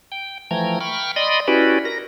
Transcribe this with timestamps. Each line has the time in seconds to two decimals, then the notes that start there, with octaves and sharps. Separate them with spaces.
0.12 G5
0.51 E3 F3 A3 G5 A#5 G#6
0.80 G5 B5 C#6 F6
1.16 D5 D#5 B5 C6 D#6
1.48 C#4 E4 F#4 G4 B4 D5
1.85 A#4 A#6